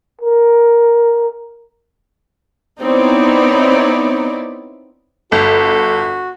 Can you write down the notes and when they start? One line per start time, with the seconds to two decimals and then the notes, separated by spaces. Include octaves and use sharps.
0.22 A#4
2.81 B3 C4 D#4 E4 C#5 D5
5.32 G1 F#4 A4